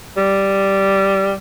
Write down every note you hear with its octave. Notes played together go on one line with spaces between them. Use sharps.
G3